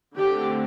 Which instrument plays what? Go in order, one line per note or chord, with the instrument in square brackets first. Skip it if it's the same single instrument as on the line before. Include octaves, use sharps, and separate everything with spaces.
[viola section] D3 A3 C4 G4